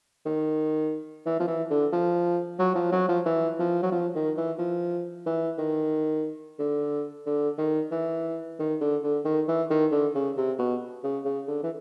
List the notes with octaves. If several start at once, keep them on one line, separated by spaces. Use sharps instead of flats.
D#3
E3
F3
E3
D3
F3
F#3
F3
F#3
F3
E3
F3
F#3
F3
D#3
E3
F3
E3
D#3
D3
D3
D#3
E3
D#3
D3
D3
D#3
E3
D#3
D3
C#3
C3
B2
C#3
C#3
D3
E3